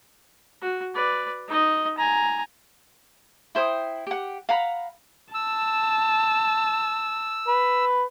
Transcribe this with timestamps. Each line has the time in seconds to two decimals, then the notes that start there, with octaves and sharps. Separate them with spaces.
0.62 F#4
0.94 B4 D5
1.48 D#4 D#5
1.98 G#5 A#5
3.55 E4 C5 G5 D#6
4.07 G4 F#5
4.49 F5 F#5 A#5 B5
5.34 A5 E6
7.48 B4